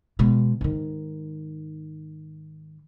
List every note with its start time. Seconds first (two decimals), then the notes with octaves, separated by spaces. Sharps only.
0.19 B2 G#3
0.61 G#2 D#3